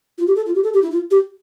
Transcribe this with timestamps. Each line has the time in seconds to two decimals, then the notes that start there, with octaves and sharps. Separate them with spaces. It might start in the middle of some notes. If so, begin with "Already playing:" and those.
0.18 F4
0.27 G4
0.36 A4
0.46 F4
0.55 G4
0.63 A4
0.74 G4
0.82 E4
0.91 F4
1.11 G4